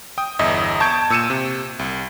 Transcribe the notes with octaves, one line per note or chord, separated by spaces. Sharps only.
G5 D#6
G1 E2 D#5 E5
A5 C#6 G6 G#6 D7
A#2 E6 C#7 D#7 E7
C3
C2